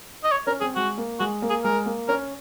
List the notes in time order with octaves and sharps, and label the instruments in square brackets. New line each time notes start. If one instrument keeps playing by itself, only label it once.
[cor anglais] D#5
C#5
[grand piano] C#4 [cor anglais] A#4
[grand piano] C4 [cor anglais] G#4
[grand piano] G#3 [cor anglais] F#4
[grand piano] A#3
[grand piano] G#3 [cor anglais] F#4
[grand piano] A#3
[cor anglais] G#4
[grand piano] G#3 [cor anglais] A#4
[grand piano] A#3
[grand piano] C#4 [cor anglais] A#4